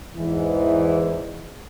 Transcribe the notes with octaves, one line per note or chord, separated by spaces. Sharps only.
E2 G#2 E3